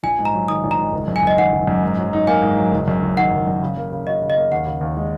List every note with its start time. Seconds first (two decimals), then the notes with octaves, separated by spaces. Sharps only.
0.03 A#1 G#5
0.19 G#2
0.25 A#5
0.34 F#3
0.48 D#3 D#6
0.63 A#1
0.71 A#5
0.79 G#2
0.93 F#1
1.08 F#2
1.16 G#5
1.23 F#1 D#5
1.38 D#3 F#5
1.53 F#1
1.67 F#2
1.83 G#2
1.98 F#3
2.13 D#4
2.27 A#3 G#5
2.42 G#2
2.57 F#3
2.72 F#1
2.88 F#2
3.03 F#1
3.17 D#3 F#5
3.32 F#1
3.47 F#2
3.63 C#3
3.77 A#3
3.92 C#3
4.07 F#4 D#5
4.22 C#3
4.30 D#5
4.37 A#3
4.51 D#2 F#5
4.66 C#3
4.81 D#2
4.97 G#3